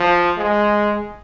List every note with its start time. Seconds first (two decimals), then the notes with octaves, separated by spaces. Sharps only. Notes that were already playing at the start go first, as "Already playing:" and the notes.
Already playing: F3
0.37 G#3